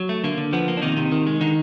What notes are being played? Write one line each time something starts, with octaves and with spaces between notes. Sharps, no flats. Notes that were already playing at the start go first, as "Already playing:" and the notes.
Already playing: F#3
A3
D3 A#3
D3
F3 B3
A#3
D4
C3 D#3 D#4
C3
D#3
G#3
D3 D#3 D#4